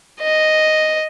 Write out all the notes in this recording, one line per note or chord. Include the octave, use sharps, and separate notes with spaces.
D#5